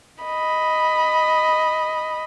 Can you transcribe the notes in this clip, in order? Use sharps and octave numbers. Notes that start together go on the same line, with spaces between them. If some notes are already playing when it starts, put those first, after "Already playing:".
D#5 B5